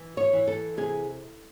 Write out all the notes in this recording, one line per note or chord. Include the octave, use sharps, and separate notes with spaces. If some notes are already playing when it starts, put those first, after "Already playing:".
Already playing: E3
C#5
E3
A4
C3 G#4